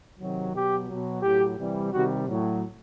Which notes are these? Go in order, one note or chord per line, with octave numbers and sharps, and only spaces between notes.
C3 D#3 F#3
B2 F#3 G4
B2 F#3
A2 F#3 G4
C3 E3 G3
C3 D#3 G3 F#4
A2 F#3